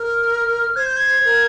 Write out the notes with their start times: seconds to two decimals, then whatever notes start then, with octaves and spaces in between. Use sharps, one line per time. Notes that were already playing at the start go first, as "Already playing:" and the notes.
Already playing: A#4 F6
0.76 C5 G#6
0.86 G6
0.96 G#6
1.25 A#4